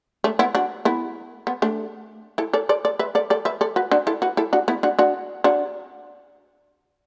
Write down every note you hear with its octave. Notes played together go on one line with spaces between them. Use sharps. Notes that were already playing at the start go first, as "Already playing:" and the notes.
A3 D4
B3 E4
D4 F#4
B3 E4
B3
A3 D4
E4 A4
A4 D5
A4 D5
A4 D5
B4 E5
A4 D5
A4 D5
B4 E5
A4 D5
F#4 B4
D4 F#4
E4 A4
F#4 B4
E4 A4
D4 F#4
B3 E4
D4 F#4
D4 F#4
D4 F#4